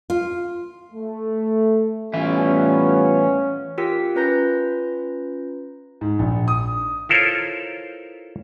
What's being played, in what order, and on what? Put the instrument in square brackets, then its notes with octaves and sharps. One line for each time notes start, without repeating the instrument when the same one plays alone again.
[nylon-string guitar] F4
[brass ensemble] A3
[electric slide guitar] A2 E3 E5 [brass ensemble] G3 B3 F4 [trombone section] C#4
[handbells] F4 G4 A#4 G5 E6 B6
C#4 F4 B4 A#5 G6 A#6
[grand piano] G#2
A#1
D#6
[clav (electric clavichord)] E4 F4 A4 A#4 C5 C#5